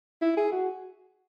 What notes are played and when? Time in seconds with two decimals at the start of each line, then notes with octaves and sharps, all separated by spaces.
0.21 E4
0.37 G#4
0.52 F#4